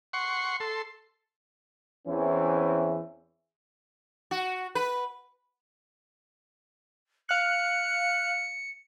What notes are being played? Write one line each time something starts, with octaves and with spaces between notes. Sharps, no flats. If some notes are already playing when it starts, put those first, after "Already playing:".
F#5 C6 C#6
A4 C6
E2 E3 C4 C#4 E4
F#4
B4
F5 F#6 C#7